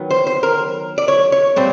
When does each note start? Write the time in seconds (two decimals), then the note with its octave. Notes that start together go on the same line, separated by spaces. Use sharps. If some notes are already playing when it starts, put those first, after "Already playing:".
Already playing: D#3 F#3 B3
0.11 C5
0.27 C5
0.43 A#4
0.98 D5
1.08 C#5
1.32 C#5
1.56 A#2 G3 C4